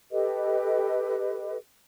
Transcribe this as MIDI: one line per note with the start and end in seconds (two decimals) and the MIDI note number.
0.11 1.57 67
0.11 1.57 69
0.11 1.57 71
0.11 1.57 75